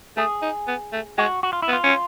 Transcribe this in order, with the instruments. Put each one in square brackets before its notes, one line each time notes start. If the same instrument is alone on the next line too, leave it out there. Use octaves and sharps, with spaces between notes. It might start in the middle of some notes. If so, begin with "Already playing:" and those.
[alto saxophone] A3 [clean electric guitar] G#4
[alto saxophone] D#4
B3
A3
[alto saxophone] G#3 [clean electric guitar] F#4
[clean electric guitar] F#4
F4
E4
[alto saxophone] B3
[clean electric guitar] F4
[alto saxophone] C#4